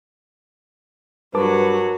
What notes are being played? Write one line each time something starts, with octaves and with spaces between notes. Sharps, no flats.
G2 F#3 F#4 A#4 B4 A5 D6